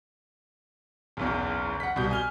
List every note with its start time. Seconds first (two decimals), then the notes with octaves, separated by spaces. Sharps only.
1.17 F#1 B1 E2
1.80 F#5 B6
1.96 C2 B2 G6
2.11 G#5 F6 G7